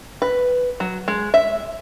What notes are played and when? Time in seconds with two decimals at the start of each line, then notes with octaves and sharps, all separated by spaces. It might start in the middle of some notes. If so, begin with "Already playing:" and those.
0.22 B4
0.80 F#3
1.08 G#3
1.34 E5